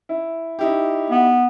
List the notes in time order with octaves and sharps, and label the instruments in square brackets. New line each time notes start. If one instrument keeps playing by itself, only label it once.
[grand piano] E4
D#4 E4 G4
[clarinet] B3